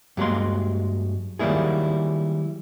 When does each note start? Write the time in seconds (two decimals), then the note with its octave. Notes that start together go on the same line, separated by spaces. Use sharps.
0.17 G2 F#3 G#3 A#3 C6
1.39 D#3 F#3 G3 A#3 E4 G#4